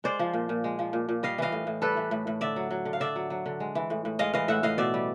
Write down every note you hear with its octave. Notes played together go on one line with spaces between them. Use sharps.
G#3 C5 D5
F3
A#2
A#2
G#3
F3
A#2
A#2
G3 D#5 F5
E3 D#5 F5
A2
A2
G3 A4 B4
E3
A2
A2
D3 D5 E5
F#3
F#3
D3
F5
D3 D5 E5
F#3
F#3
D3
G#3
E3
A2
A2
G#3 D#5 F5
E3 D#5 F5
A2 E5 F#5
A2 D#5 F5
B2 D5 E5
G3